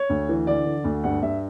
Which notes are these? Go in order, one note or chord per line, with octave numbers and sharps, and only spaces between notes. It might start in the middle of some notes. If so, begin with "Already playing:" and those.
Already playing: C#5
D2
E3
D3 D5
D3
D2
G2 F#5
G2 E5